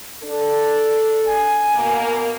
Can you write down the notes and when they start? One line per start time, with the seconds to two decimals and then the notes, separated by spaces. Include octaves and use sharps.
0.24 D4 A4
1.26 G#5
1.74 B2 A#3